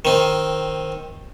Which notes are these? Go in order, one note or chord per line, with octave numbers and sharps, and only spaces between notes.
D#3 C4